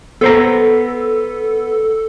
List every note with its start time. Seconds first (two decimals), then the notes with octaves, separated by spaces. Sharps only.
0.21 B3 A4 C5 A#5